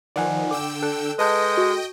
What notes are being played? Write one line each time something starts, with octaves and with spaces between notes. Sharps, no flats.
D#3 F3 D5 F#5 G#5
D3 G5 D6 E6
A4 F#6
G#3 B4 D#5 G5 A5 G6
F#4